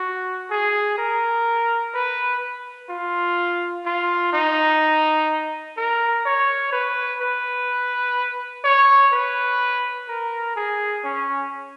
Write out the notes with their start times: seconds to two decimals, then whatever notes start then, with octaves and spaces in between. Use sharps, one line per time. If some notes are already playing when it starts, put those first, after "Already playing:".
Already playing: F#4
0.50 G#4
0.98 A#4
1.94 B4
2.90 F4
3.86 F4
4.33 D#4
5.77 A#4
6.25 C#5
6.73 B4
7.21 B4
8.64 C#5
9.12 B4
10.08 A#4
10.56 G#4
11.04 C#4